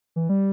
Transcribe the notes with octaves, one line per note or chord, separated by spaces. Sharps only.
E3
G3